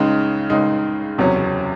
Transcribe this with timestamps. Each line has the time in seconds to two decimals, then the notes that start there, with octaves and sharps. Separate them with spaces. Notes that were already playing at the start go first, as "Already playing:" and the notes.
Already playing: C#2 C#3 G#3 D#4
0.50 C#2 C#3 G#3 D#4
1.18 F#1 E2 C3 F#3 C#4